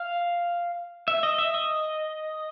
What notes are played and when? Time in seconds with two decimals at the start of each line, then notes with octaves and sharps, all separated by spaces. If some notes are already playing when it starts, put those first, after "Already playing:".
Already playing: F5
1.08 E5
1.23 D#5
1.38 E5
1.54 D#5